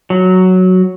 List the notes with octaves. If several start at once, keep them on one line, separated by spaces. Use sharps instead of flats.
F#3